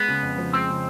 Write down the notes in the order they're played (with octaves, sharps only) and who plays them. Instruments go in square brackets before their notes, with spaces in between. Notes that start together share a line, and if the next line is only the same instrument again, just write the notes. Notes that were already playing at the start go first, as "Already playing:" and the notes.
Already playing: [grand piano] G#3 [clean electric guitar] B3
[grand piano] C#3
F2
F3
[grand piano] G#3 [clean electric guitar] C4
[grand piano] C#3